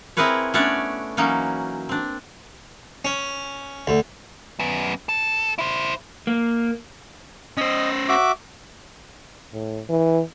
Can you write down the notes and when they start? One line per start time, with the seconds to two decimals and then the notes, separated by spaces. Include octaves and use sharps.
0.17 C4 E4 G#4 A#4 B4 C#5
0.54 A3 B3 C#4 D4 C#5 D5
1.17 E3 F#3 A#3 C#4 D#4
1.89 C4 D4
3.05 C#4
3.87 D2
4.59 F#2 B3
5.09 A4
5.58 E4 C5
6.27 A#3
7.57 C#4 C5 D#5
8.09 F#4 E5 D6
9.53 A2
9.89 E3